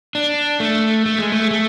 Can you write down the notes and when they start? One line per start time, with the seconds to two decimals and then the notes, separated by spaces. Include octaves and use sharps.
0.15 D4
0.60 A3
1.06 A3
1.19 G#3
1.32 A3
1.51 A3